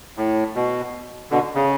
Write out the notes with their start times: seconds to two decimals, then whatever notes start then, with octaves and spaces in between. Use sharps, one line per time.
0.18 A2
0.55 B2
1.31 B2 D3
1.55 C#3